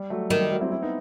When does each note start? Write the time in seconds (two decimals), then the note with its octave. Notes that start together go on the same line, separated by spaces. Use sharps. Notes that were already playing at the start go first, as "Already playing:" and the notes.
Already playing: G3
0.10 F#3 A3
0.30 D#3 G3
0.41 G3
0.51 F#3 A3
0.61 C4 E4
0.72 C4 E4
0.82 B3 D#4